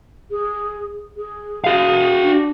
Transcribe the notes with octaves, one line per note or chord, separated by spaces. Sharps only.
G#4
G#4
F#4 G#4 F5
D4